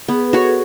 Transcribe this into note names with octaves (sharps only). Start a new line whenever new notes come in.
B3 G#4
B4
F#4 A4 C#5
G#4